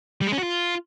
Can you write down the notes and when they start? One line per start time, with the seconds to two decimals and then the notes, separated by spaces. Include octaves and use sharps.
0.21 G3
0.27 G#3
0.32 C#4
0.38 F#4
0.43 F4